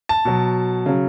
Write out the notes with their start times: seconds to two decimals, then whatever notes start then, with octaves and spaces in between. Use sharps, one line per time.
0.09 A5
0.25 B2 F#3
0.86 C#3 F#3